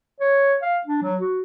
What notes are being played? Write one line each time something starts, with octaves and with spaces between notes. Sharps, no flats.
C#5
F5
D4
F#3
F#4